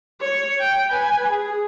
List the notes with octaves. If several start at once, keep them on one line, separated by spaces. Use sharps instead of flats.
C#5
G5
B4 G#5
G#4